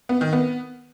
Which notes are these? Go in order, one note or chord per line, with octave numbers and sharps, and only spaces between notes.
B3
D#3
B3